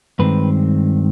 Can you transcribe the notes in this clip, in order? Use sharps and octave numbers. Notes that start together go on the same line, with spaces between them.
G2 D#3 G#3 C4 B4